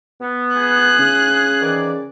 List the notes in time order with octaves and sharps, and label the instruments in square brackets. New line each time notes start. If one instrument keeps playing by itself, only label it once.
[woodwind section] B3
[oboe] G#4 [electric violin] F#6
[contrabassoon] C#3
[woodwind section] D#3 E3 D5